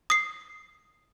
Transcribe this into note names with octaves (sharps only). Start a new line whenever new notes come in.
D#6 C7